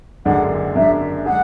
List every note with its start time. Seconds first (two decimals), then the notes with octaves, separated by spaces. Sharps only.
0.25 F#1 F#2 D3 G#3 D4 F#5
0.75 F#1 F#2 D3 G#3 D4 E5
1.26 D3 G#3 D4 G#4 F#5